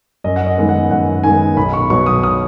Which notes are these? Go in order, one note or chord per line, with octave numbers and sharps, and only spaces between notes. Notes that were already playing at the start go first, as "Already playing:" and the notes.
F#2 D#5
F#5
D#5
D#3 G#3 B3
F#5
F#2 F#5
D#3 G#3 B3 G#5
B1 B5
C#6
B2 F#3 B3 C#6
D#6
D#6